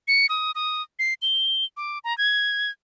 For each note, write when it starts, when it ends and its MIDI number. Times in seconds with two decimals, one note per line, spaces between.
0.08 0.26 97
0.29 0.51 87
0.55 0.82 87
0.99 1.14 96
1.22 1.65 103
1.77 1.99 86
2.04 2.16 82
2.18 2.70 92